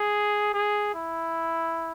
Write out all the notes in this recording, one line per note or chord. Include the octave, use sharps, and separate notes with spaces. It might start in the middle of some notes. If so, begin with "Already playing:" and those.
Already playing: G#4
G#4
E4